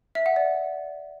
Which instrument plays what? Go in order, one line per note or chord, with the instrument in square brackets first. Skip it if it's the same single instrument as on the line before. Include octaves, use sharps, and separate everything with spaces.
[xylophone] E5
F#5
D5